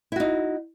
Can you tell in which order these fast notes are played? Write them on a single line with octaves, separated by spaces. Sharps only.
E4 F#4 D#4